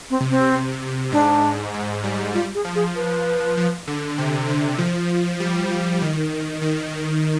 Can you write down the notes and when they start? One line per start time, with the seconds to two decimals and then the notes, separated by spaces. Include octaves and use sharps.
0.10 C4
0.20 C3
0.30 C4
1.12 G#2 D4
1.74 G#2
2.04 G3
2.34 G3 F4
2.55 G#4
2.65 F3
2.75 G#4
2.95 B4
3.57 F3
3.87 D3
4.18 C3
4.48 D3
4.78 F3
5.40 G3
5.71 F3
6.02 D#3
6.62 D#3